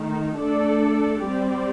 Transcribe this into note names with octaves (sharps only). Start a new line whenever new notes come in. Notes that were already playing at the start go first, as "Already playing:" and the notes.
Already playing: D#3 A3 D#4
A3 D4 A4 D5
G3 C4 G4 D5